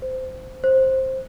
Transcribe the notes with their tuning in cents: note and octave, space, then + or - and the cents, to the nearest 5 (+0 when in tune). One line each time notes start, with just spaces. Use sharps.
C5 -20
C5 +10